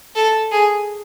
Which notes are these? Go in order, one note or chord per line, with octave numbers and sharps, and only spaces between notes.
A4
G#4